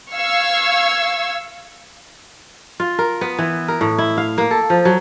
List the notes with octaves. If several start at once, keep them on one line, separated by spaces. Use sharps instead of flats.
F5 C#6 E6 G#6
F4
A#4
B3
E3
A#4
A2
E4
F5
A#3
A4
F3
F#3